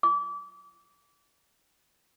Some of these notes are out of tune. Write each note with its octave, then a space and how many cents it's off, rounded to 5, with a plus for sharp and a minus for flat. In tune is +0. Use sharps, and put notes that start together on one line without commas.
D6 -30